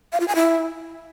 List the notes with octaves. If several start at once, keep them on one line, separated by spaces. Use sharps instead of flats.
F5
F4
G#5
E4